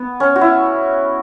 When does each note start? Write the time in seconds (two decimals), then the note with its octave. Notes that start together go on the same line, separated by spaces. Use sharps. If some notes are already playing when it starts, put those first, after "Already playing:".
Already playing: B3
0.20 C#4
0.36 F#4
0.41 E4